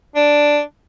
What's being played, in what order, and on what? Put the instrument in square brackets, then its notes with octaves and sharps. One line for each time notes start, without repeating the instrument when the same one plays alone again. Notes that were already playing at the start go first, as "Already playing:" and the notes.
[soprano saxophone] D4